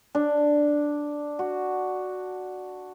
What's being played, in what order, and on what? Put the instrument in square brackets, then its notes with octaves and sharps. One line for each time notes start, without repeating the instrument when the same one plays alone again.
[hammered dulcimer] D4
F#4